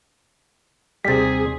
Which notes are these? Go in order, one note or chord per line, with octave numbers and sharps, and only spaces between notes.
D#2 C3 G3 G#4 A6 B6